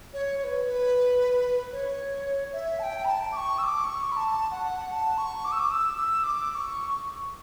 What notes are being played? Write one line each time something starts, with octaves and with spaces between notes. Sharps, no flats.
C#5
C#5
B4
B4
C#5
E5
A5
G5
B5
A5
D6
C#6
E6
D6
C#6
B5
A5
F#5
A5
C#6
D6
E6
D6
E6
E6
D6
D6
C#6